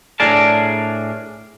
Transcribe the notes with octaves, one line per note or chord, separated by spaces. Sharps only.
A2 D4 G#4 A#4 D5 A5